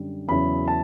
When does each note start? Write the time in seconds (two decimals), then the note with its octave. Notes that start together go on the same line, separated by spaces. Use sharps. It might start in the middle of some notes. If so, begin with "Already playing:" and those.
Already playing: F#2 D3 G3
0.28 E2 C#3 F#3 C#4 E4 B5
0.68 A5